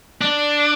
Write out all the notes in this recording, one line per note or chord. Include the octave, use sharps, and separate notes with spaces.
D4